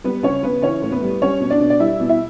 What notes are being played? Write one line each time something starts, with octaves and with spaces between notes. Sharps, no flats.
G3 B3 B4
C#3 C#4 C#5
C#3 B3 B4
E3 C#4 C#5
A2
B3 B4
G3
G3 C#4 C#5
B2
D4 D5
B2
D5
G3 E4 E5
B2
E4 E5